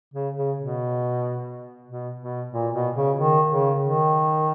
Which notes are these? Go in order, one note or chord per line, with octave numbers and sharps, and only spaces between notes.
C#3
C#3
B2
B2
B2
A#2
B2
C#3
D#3
C#3
D#3